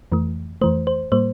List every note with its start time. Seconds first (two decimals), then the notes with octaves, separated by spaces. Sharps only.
0.12 F2 E3 A3
0.61 F2 E3 A3 C5
0.87 C5
1.12 A2 G3 A#3 C5